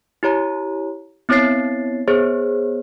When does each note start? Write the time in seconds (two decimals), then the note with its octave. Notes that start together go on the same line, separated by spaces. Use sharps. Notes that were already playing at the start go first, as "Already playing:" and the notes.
0.23 E4 G4 C#5 A#5
1.29 B3 C4 E4 C#5 A6 C7
2.08 B3 G#4 C5 C#5